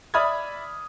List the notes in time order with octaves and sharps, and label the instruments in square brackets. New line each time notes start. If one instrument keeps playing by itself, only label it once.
[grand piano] D5 E5 B5 D#6 F6 G#6